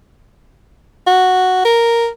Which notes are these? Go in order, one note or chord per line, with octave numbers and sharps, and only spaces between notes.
F#4
A#4